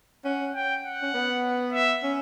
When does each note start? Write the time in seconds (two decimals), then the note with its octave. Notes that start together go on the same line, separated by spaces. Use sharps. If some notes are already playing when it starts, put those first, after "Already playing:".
0.25 C#4 F#5
0.55 G5
0.85 F#5
1.02 C#4
1.14 B3
1.73 E5
2.03 C#4